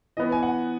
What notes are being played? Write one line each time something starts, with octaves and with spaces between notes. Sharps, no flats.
E3 B3 D#5
G#5
F#5